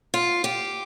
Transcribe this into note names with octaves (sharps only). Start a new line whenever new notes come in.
F4
G4